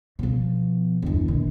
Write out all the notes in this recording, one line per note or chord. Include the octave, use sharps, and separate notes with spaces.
B2 F3
G1 E2
A#1 D#3